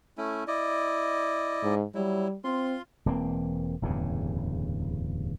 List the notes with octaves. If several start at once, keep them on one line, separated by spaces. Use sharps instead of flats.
A3 C#4 E4
E4 D5 D#5
G#2
F#3 G3 E4
C4 F4 C6
E1 E3 A#3 C4
D1 E2 G2 C#3